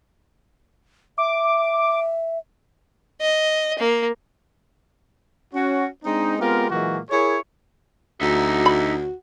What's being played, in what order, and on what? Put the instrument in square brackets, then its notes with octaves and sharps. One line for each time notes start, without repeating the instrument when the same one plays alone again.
[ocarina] E5 [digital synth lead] D6
[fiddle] D#5
A#3
[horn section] C#4 F#4
G#3 C4 D4 D#4
G#3 B3 C4 F4 G4 A#4
A#2 E3 F#3 G#3 A#3 F#4
E4 G#4 A#4 C#5
[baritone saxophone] D2 [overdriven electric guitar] D#4 E5 [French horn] F#4
[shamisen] B5